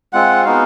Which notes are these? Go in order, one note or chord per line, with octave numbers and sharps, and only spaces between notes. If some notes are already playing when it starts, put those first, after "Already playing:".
G#3 C4 F4 F#5
G#3 B3 D#4 F#4 F5